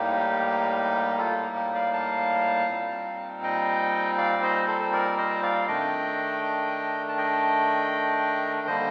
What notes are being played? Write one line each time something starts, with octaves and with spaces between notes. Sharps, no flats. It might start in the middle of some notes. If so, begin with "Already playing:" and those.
Already playing: A2 G3 A#3 D#4 G4
F4 A4
G4
D5 F5
F5 A5
A#2 G3 C4 D#4
D#5 G5
D5 F5
C5 D#5
A4 C5
A#4 D5
C5 D#5
D5 F5
D#3 A3 D4 D#5 G5
A5
D#5 G5
D3 G3 A#3 C5 D#5